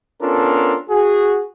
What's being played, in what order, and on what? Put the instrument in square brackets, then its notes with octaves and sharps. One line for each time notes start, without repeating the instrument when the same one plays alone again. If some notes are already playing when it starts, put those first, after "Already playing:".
[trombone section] B3 C#4 D4 F4 A4 A#4
F#4 G#4